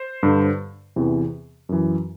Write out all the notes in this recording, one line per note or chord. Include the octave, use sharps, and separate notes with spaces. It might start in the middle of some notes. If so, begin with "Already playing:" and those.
Already playing: C5
G2 D3
E2 C3 E3
F#2 E3